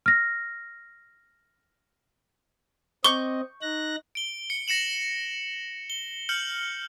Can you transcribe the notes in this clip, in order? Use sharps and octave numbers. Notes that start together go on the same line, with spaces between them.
F6 A#6
C4 D#5 C#6 G6 G7
D#4 F#6 A#6
D7 G7
C#7
A#6 C#7 E7 F#7
G7
F6 G6 C#7 F#7